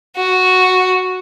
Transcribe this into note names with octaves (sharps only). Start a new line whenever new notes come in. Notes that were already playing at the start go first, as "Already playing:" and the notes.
F#4